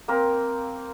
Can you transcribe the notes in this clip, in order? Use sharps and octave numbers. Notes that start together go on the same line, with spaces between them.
A#3 C4 A#4